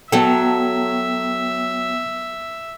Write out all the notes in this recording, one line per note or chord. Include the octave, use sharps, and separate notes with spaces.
F#3 B3 A4 E5 G5